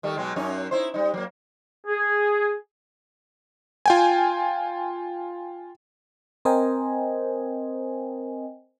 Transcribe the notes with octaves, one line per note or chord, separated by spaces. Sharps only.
D#3 G3 A3
B2 F#3 G#3
F#2 C#4 D#4
D#4 E4 C5
G3 D#4
F#3 A#3
G#4
F4 G5 G#5
C4 A#4 C5 D#5 G5 G#5